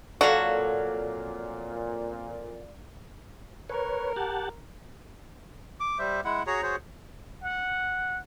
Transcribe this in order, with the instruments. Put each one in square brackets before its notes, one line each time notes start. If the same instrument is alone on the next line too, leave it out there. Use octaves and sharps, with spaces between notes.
[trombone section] F2 A#2 [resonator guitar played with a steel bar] F#3 A4 [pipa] F#4 [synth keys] D5 F5
[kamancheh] A#4 [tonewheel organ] B4 C#5
[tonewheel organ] G4 F#5 A5
[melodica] D6
G3 C5 E5
G#3 E4 F#5
F#4 G#4 C#5 A#5
F#4 G#4 C5 C#5
[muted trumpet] F#5